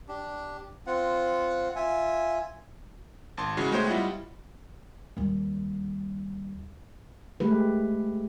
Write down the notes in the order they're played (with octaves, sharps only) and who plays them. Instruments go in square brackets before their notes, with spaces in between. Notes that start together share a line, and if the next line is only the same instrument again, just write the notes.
[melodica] D4 G4
C4 F4 F#5
F4 E5 G#5
[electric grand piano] G#1 A5 C6
C#3 E3 G#3 F#4
G#3 A3 B3 C5 C#5 G5
G3 E4 F4 D#5 F#5
[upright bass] D#2 G3
[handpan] G#3 A3 G4 B4